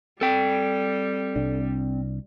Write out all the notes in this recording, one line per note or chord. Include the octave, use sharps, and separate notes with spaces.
G3 C4 A4 G5
C2 D4